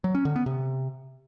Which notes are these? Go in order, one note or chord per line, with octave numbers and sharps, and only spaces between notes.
F#3
C#4
D3
B3
C3